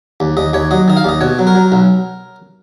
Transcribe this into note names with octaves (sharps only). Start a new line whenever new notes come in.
D#2
D#2 D#5
D#2 C#5
F#3 D#5
D#3 D#5
F5
D#2 D#5
B2 C#5
F#3
A#4
F#3
B1